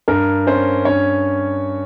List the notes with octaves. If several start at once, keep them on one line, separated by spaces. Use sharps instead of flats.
G2 A#4
C#4 C5
G2 C#5